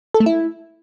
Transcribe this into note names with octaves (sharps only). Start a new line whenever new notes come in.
A4
A3
E4